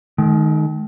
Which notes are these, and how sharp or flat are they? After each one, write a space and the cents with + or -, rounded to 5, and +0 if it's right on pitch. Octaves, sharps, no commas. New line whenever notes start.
D#3 +0 G#3 +45